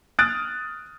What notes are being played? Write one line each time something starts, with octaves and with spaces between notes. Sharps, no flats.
D#6 F6 F#6 A6 D7